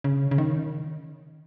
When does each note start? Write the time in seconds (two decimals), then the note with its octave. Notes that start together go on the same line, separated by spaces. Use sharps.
0.04 C#3
0.31 C#3
0.38 D#3